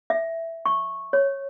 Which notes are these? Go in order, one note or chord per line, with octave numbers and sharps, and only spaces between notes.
E5
C#6
C#5